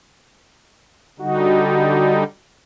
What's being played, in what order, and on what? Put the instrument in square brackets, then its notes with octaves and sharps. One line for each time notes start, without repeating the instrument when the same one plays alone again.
[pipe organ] D3 G3 D#4 [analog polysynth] F#4